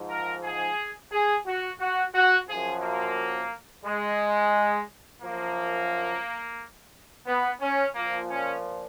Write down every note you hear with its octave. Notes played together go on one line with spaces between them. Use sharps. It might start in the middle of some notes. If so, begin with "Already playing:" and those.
Already playing: G#2 F3
A#4
G#4
G#4
F#4
F#4
F#4
F#2 F3 G#4
A#3
G#3
F#2 F3 A#3
B3
C#4
A#2 F3 A#3
C#4